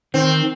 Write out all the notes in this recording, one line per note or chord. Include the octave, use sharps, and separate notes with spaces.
D#3 C4